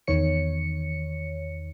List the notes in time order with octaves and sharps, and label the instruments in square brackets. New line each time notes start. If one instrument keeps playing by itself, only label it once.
[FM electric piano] E2 D#3 C#5 C#7